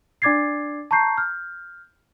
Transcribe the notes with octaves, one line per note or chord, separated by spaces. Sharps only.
D4 D5 D6 G#6 A6 C7
A5 A#5 C#6 G6 C7
F6 G6